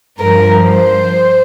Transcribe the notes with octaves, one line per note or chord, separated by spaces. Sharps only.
G2 F3 A#4
C5